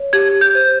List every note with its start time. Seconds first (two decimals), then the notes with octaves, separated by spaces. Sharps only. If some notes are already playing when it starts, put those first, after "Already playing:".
Already playing: C#5
0.13 G4 G#6
0.41 G6
0.55 C5